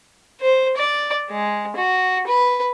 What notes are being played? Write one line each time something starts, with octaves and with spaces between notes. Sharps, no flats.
C5
D5
G#3
F#4
B4